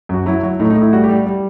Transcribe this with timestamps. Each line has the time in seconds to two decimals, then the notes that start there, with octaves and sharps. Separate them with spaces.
0.09 F#2 F#4
0.26 F#3 E4
0.43 F#3
0.60 A2 D#4
0.70 D#4
0.76 A2
0.82 E4
0.93 G3 F#4
1.04 G4
1.09 G3
1.27 G3